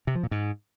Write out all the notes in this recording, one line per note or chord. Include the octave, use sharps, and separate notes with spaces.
C3
F3
A#2
G#2